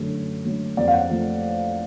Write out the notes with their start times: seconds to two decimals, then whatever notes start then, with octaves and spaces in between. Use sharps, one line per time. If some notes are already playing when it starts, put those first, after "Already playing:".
Already playing: F#2 D3 F#3 A3
0.12 F#2
0.45 D3 F#3 A3
0.77 F2 D5
0.88 F5
0.94 F#5
1.10 F3 A3